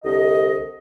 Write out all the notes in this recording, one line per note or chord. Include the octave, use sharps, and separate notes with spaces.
C2 D3 D#5